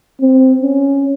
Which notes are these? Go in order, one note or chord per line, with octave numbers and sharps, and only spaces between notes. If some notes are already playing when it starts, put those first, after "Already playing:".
C4
C#4